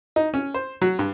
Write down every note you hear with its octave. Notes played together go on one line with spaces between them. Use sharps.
D#4
C#4
C5
F#3
G2